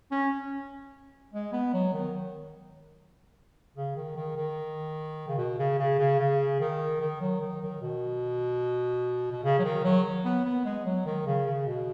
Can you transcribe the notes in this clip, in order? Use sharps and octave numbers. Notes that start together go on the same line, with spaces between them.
C#4
G#3
B3
F#3
D#3
C#3
D#3
D#3
D#3
C#3
B2
C#3
C#3
C#3
C#3
D#3
D#3
F#3
D#3
D#3
B2
B2
C#3
F#3
D#3
F#3
B3
B3
G#3
F#3
D#3
C#3
C#3
B2